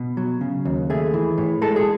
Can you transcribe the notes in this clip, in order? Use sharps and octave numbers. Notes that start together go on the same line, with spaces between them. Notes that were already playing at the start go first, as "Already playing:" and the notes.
Already playing: B2
F#3
C#3
D#2
A3 G#4
E3
A2
G#3 A4
G#4